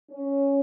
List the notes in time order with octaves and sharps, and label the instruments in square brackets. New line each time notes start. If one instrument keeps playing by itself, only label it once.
[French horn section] C#4